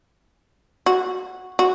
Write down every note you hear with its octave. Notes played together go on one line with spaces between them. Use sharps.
F#4
F#4